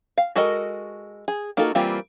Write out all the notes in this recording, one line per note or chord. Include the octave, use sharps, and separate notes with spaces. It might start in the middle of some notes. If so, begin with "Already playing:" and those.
F5
G#3 F#4 A4 A#4 D#5
G#4
A#3 D#4 F4 F#4 A4
E3 G3 A#3 C4 F4